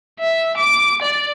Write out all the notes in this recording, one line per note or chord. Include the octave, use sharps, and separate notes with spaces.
E5
D6
D5